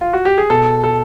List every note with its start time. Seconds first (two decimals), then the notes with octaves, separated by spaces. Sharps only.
0.01 F4
0.13 F#4
0.25 G4
0.38 G#4
0.50 B2 A4
0.84 A4